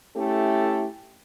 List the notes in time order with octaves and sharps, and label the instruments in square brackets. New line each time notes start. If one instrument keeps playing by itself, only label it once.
[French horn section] A3 C#4 E4 G4 A4